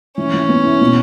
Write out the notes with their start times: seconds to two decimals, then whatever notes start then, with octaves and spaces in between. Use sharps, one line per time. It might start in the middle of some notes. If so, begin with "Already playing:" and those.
0.18 E3 C#4
0.33 E3
0.49 B3
0.65 E4
0.81 B2